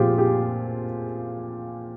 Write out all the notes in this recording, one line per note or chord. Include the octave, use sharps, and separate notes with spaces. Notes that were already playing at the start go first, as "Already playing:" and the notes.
Already playing: A#2 F3 C4 F4 G4 G#4
G4